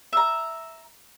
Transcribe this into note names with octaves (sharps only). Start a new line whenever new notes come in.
E5 A#5